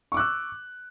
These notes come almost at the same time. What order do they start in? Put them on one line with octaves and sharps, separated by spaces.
C#6 D6 F#6 E6